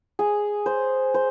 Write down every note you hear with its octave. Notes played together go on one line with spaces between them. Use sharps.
G#4
C5
C5